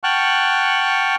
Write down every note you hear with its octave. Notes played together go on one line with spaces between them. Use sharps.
F#5 G5 A5 C#6 F6 F#6